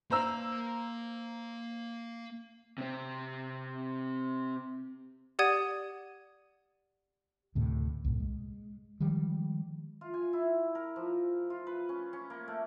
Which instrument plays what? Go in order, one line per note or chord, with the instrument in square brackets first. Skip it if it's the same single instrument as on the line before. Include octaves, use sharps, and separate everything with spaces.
[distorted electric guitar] A#3 F5 [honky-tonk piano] C5 A#5 E6
[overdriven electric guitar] C3 C4
[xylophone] G4 D5 F#5 D#6 G#6 D#7
[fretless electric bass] D2 A2 C3
C2 G2 A#2
G#3
D#3 F3 G3 G#3
[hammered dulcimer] F4
G#5
E4
A#4
F3
F4
B4
C#4
C#4
A#3
A3